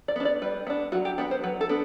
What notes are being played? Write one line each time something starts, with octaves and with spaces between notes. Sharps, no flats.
D5
B3 D4
D5
G3 B4
B3 D4
F#3 F#4
G4
B3 D4 F#4
C5
F#3 B4
A4
B3 D4